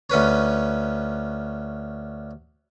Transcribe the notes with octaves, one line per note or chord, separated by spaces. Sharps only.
D2 C#4 B4 C#5